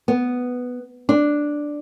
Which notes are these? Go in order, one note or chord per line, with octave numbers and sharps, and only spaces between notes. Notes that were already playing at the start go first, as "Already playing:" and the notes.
B3
D4